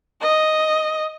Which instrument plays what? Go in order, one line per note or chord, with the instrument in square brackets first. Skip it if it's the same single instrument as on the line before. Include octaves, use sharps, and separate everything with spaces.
[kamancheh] D#5